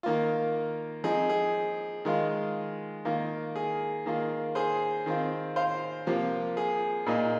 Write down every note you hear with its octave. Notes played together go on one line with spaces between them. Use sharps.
D#3 A#3 F4
F3 C4 D#4 G#4
G#4
D#3 G#3 F4
D#3 A#3 F4
G#4
D#3 A#3 F4
G#4 C5
D#3 C4 F4
C5 F5
C3 F3 A#3 F4
G#4
A#2 A#3 D#4